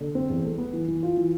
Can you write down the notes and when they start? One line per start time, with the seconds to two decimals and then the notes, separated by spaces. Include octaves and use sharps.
0.01 D3
0.15 C4
0.30 E2
0.45 A3
0.58 B3
0.73 E3
0.88 E3
1.03 F4
1.17 E3